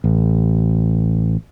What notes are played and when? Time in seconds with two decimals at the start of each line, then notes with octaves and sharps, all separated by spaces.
0.04 A1